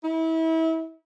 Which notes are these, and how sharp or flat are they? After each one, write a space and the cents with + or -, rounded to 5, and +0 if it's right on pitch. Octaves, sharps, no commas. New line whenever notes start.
E4 -30